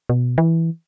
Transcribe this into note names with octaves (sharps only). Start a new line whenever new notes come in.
B2
E3